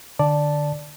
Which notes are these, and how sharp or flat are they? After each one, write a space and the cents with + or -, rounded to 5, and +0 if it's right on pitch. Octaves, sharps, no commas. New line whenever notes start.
D3 +15 D5 +0 A5 +0